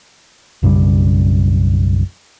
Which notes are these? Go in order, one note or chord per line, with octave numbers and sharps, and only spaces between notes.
B1 F#2 C#3 G3